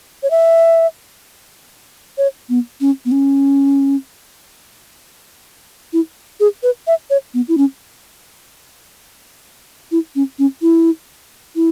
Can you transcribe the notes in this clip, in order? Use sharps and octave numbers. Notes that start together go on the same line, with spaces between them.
C#5
E5
C#5
B3
C#4
B3
C#4
E4
G#4
B4
E5
C#5
B3
E4
C#4
E4
C#4
C#4
E4
E4